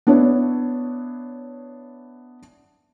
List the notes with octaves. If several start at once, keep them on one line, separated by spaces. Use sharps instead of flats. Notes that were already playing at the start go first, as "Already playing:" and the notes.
B3 D4 E4 C#5